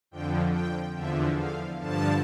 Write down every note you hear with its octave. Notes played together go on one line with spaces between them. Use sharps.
F2 D3 F3 G5
G5
E2 D3 F3 E5
F5
G2 D3 F3 A5